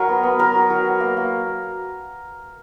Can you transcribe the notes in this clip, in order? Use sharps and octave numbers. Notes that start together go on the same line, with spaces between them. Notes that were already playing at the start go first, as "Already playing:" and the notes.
Already playing: F#3 A#4
B3
B3
F#3 A#4
F#3
F#3
F#3
A#3
A#3